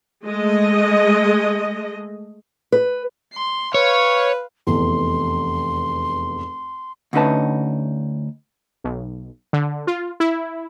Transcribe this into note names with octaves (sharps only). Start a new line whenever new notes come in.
G#3 A3 D#5
B4
C6
B4 C#5 F5
F1 E2 C6
D2 D3 C#4 D#4 B4 A5
B1
D3
F4
E4